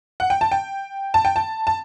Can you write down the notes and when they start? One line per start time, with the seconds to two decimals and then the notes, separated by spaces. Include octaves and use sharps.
0.20 F#5
0.30 G5
0.41 A5
0.52 G5
1.14 A5
1.25 G5
1.36 A5
1.67 A5